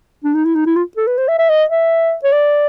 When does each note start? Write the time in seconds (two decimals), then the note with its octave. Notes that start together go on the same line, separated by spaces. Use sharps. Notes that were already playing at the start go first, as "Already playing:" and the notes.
0.24 D4
0.34 D#4
0.45 E4
0.55 D#4
0.66 E4
0.76 F4
0.97 A4
1.07 B4
1.18 C5
1.28 E5
1.38 E5
1.49 D#5
1.70 E5
2.24 C#5
2.32 D5